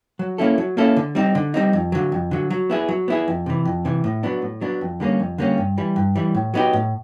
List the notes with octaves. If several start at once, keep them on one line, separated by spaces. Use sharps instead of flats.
F#3
A#3 C#4 E4 A4
F#3
A#3 C#4 E4 A4
D3
G3 C4 D#4
D3
G3 C4 D#4
F2
D3 F#3
F2
D3 F#3
F#3
B3 E4 G#4
F#3
B3 E4 G#4
F2
C3 E3
F2
C3 E3
A2
F#3 B3 D4
A2
F#3 B3 D4
F2
D3 G3 A#3 C#4
F2
D3 G3 A#3 C#4
G2
E3 G3
G2
E3 G3
A2
F#3 B3 D#4 G4
A2